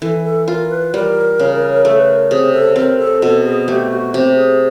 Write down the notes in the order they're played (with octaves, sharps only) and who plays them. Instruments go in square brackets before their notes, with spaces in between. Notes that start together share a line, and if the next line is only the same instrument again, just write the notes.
[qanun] E3 [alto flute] A4
[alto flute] A4
[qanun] F4 [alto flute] A#4
[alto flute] B4
[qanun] G3 [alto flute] A#4
[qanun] C#3
[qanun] A3 [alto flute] A4
[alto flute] B4
A#4
[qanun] C3 [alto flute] G#4
[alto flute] A4
[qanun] C4 [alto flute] A#4
[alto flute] A4
[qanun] B2 [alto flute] A4
[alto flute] G#4
[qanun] A3 [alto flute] G4
[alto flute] F#4
[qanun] C3 [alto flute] G4
[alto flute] G#4